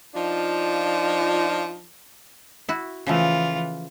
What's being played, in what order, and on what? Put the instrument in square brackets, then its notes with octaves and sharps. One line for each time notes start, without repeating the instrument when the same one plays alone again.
[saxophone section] F3 D4 D#4 F4
[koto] E4 F#4
[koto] C#3 F3 A3 [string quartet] E3 F4